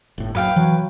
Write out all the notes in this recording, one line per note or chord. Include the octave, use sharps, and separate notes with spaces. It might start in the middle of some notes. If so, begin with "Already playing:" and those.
G1 A2
F#2 B4 F5 G5
E3 F#3